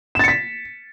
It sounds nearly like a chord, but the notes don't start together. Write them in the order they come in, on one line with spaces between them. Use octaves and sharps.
E7 A6 C#7 B6